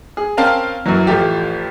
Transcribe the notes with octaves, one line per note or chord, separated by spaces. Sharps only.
G#4
C4 C#4 A#4 F5 G5 A5
F#2 E3 F#3
A1 F3 A3 G4